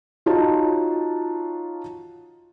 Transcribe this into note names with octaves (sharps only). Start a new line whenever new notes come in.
D#4 F4 F#4 C#5 D#5 A5